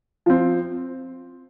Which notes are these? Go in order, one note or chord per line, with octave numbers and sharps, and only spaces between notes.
F3 C4